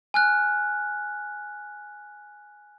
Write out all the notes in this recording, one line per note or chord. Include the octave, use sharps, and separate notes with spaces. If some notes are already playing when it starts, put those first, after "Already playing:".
G#5 F6 F#6